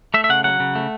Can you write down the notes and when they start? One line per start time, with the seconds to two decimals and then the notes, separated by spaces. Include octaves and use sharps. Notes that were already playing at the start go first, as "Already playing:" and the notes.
0.14 A3 E5
0.24 E5
0.29 C#3 F#5
0.44 F#3 F#5
0.60 C#3
0.75 A3